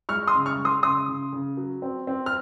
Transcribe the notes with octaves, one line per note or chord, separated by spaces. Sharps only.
G#3 C#6 F6
C6 D#6
C#3
C#6 F6
G#3
C6 D#6
C#3 C6 D#6
C#3
C#3
F#3
C4
C4
F6